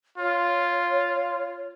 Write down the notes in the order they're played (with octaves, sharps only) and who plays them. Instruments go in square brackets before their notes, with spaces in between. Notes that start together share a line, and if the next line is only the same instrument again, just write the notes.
[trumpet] F4 [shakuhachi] C#5